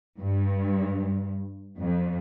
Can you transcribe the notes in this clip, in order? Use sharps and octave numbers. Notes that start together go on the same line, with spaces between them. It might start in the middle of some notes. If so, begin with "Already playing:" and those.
G2
F2